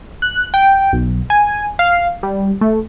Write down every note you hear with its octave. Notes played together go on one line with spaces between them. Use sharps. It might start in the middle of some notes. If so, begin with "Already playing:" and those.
F#6
G5
B1
G#5
F5
G3
A3